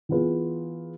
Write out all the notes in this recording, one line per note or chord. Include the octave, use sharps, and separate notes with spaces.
E3 B3 F4 G#4 B4